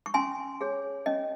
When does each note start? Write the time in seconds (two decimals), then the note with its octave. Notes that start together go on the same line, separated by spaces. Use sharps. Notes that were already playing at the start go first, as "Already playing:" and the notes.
0.06 C#6
0.14 C#4 G#5 C6
0.61 G#4 C#5
1.06 C#4 D#5